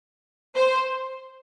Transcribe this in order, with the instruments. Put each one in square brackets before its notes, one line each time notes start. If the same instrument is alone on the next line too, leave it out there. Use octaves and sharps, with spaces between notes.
[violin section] C5